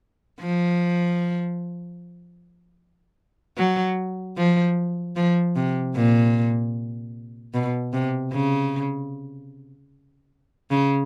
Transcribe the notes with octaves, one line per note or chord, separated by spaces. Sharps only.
F3
F#3
F3
F3
C3
A#2
B2
C3
C#3
C#3